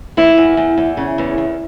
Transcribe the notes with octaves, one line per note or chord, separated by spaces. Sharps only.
E3 E4
E2
E2
E2
C#3
E2
E2